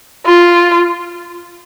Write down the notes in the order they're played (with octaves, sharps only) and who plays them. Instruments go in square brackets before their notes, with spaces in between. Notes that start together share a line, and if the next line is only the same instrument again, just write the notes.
[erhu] F4